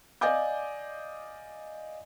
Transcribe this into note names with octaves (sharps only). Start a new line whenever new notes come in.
D5 D#5 F5 G#5 D6 G6